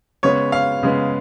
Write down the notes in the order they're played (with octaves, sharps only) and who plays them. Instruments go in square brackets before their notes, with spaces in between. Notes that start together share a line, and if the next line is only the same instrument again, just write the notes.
[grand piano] C#3 G#3 B3 C#5
F5
C#3 G#3 B3